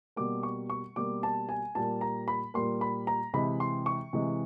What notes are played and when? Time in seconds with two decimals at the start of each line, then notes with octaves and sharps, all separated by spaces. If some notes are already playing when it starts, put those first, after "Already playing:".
0.16 B2 G3 A#3 D6
0.43 C#6
0.70 C#6
0.96 B2 G3 A#3 D6
1.23 A5
1.49 G#5
1.75 A#2 G3 A#3 A5
2.01 A#5
2.28 B5
2.54 A#2 G3 A#3 C6
2.81 B5
3.07 A#5
3.34 C3 E3 G#3 B5
3.60 C6
3.86 C#6
4.13 C3 E3 G#3